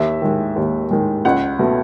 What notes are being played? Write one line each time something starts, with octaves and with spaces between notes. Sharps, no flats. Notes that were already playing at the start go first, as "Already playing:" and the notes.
Already playing: D#2 E5
D#3 G#3
D#2
D#3 G#3
C#2 F#5
B2 A3